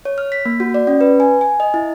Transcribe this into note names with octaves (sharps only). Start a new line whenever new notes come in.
C#5
F6
B6
A#3
F#4
D5
C#4
B4
G#5
G#5
D#5
E4